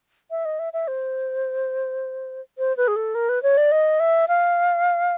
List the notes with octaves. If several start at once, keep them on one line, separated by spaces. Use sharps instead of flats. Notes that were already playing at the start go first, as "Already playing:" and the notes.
E5
D#5
E5
E5
C5
C5
B4
G#4
A4
A#4
B4
C#5
D5
D#5
E5
F5